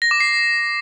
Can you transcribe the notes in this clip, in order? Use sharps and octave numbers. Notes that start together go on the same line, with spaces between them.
A#6
D6
C7